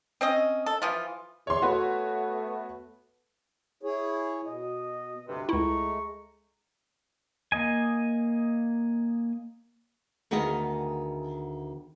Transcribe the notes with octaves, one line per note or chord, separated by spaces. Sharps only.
C4 C#4 D#5
A4
E3 F3 F4
E2 C#5 C6
A3 B3 F#4 B4 C#5
E4 G#4 C#5
B2 D#5
D2 G2 C3 B4
C#2 G#3 A3 E4 A#5 C#6
A#3 D#5 G#5
D2 D#3 B3 G#4 D#5 F5